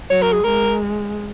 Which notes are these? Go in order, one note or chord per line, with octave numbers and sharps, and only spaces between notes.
F#3 C#5
A#4
G#4
G#3 A#4